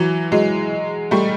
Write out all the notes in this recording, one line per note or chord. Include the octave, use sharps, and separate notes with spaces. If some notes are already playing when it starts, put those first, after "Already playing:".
Already playing: E3 F#3
F#3 G#3
G3 A3